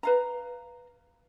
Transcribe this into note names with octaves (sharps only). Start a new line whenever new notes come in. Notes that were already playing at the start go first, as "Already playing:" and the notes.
B4 F5 A#5